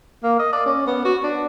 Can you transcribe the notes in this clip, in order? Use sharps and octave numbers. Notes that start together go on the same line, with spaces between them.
A#3
D#5
D5
C#4
B3
F#4
D4